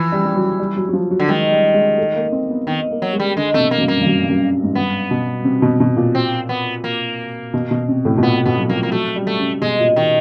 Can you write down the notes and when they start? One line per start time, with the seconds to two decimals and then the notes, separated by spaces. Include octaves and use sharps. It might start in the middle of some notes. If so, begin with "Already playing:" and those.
Already playing: E3 F3
0.12 G3
0.25 G3
0.35 F#3
0.59 G3
0.76 F#3
0.88 F#3
0.93 F3
1.11 F#3
1.20 D3
1.28 D#3 G#3
1.51 G3
1.74 G#3
1.98 A3
2.16 A#3
2.32 C4
2.50 B3
2.67 D#3 B3
2.91 A#3
3.02 F#3
3.13 G#3
3.20 G3
3.37 D3 G#3
3.54 C3 A3
3.60 B2
3.71 A#3
3.78 F#2
3.83 G2
3.88 A#3
4.01 G2
4.06 F#2
4.23 G2
4.30 F#2
4.63 G#2
4.75 G2 B3
5.11 B2
5.45 C3
5.62 B2
5.80 B2
5.97 A#2
6.15 C4
6.49 B3
6.84 A#3
7.54 B2
7.71 B2
7.88 C3
8.05 A2
8.18 B2
8.22 A#2 B3
8.45 B2 B3
8.58 F#3
8.69 F3 A#3
8.83 A#3
8.92 F#3 A3
9.15 G3
9.27 A3
9.39 C#3
9.61 B2 G#3
9.79 A#2
9.96 D#3